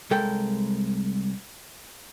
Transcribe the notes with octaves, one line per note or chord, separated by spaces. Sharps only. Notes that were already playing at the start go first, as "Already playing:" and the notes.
C2 G#3 A4 A#4 G5